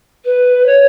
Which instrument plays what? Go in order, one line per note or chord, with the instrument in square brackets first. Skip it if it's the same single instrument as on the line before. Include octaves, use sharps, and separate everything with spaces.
[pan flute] B4
C#5